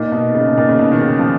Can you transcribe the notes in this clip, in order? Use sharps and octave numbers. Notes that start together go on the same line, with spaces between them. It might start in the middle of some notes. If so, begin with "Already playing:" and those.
Already playing: A#2 D#4
B2
C#3
B2
A#2
C#3
B2
D#3
C#3
F3